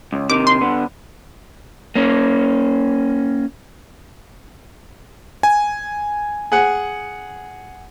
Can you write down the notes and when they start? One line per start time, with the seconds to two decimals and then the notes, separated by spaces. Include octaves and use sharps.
0.13 C#2
0.30 C3 D#3 D6
0.47 C6
0.61 D3 B3
1.96 A#3 C#4
5.43 G#5
6.52 G#4 F#5